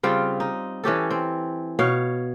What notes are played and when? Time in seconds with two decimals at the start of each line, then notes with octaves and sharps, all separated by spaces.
0.03 C#3 G3 C4 F4
0.40 D#4
0.84 E3 C#4 G4 A4
1.11 C4
1.79 B2 C#5 F5